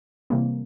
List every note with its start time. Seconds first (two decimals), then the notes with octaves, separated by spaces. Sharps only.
0.30 C3 E3 G3 A#3